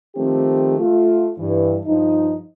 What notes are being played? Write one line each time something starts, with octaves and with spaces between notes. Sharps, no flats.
D#3 F3 A3 C4 G4
A3 F4
G2 E3
G2 F3 D#4